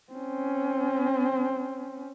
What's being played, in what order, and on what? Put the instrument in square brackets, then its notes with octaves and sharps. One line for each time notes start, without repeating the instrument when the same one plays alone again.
[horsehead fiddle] C4 C#4